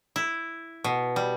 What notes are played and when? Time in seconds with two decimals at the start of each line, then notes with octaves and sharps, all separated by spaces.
0.16 E4
0.84 B2
1.16 G3